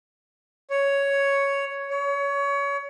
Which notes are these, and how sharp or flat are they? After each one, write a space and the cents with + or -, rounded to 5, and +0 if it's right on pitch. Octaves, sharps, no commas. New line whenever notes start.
C#5 +5
C#5 +25